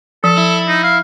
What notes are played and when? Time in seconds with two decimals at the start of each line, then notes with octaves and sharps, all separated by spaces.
0.24 F3 A4
0.38 E4
0.68 D#4
0.83 F5